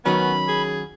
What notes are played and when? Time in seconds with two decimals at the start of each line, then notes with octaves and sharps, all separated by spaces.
0.05 D#3 F#3 B3 C#4 B5
0.48 G#4